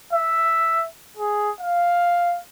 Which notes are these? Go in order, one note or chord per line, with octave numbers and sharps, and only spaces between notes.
E5
G#4
F5